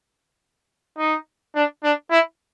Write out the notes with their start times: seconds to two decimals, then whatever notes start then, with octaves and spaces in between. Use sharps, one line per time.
0.98 D#4
1.55 D4
1.84 D4
2.11 E4